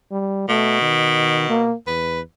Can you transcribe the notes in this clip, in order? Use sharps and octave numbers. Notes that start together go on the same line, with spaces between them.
G3
B2 A3
D#3
A#3
E2 B4